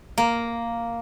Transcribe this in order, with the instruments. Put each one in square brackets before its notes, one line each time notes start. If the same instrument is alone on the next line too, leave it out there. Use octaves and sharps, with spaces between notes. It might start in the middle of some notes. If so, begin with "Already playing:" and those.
[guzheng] A#3